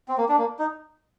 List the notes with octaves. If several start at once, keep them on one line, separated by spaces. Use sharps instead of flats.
C4
A#3
D4
A#3
D#4